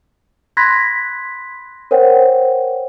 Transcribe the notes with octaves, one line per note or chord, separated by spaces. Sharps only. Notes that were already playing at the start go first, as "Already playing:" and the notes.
B5 C6 F#6 G#6 A#6 B6
A#4 C5 C#5 F#5 G5